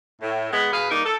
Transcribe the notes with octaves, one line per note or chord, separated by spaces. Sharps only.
A2
G#3 B3
B2 G#4 B4 F5
G3 A#3 D#4 A#4
A4